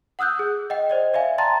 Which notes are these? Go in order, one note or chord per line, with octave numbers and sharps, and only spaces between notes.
F#5 D#6 E6 F#6 G6
G#4
D#5 F#5 G5
C5 D5 D#5
D5 E5 F5 G#5
G5 A5 A#5 C6 A6